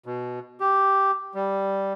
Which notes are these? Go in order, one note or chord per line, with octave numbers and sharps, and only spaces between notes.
B2
G4
G3